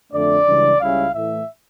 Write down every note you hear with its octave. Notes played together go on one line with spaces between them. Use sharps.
F2 D3 A3 D4 D5
C#2 C#3 E3 G3 D4
C#2 C#3 G3 C#4 E4 F5
A2 E3 A3 E5